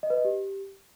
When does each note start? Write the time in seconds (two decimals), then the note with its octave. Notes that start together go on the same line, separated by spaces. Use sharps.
0.03 D#5
0.10 B4
0.17 D#5
0.25 G4